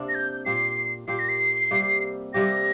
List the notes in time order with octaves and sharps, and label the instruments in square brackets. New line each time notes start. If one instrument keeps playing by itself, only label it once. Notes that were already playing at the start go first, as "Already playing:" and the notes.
Already playing: [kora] C3 A#3 D4
[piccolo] A#6
G6
[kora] A#2 A#3 G4 [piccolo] C7
[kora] A#2 A#3 G4 [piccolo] C7
[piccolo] A#6
C7
[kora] C3 G3 A#3 G4
[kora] C3 G3 A#3 G4 [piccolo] A#6